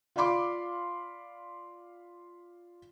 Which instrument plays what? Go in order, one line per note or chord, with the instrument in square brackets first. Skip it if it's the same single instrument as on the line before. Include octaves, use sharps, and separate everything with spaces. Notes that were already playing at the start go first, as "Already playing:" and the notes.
[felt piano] F4 D5 F5 B5 C6 D6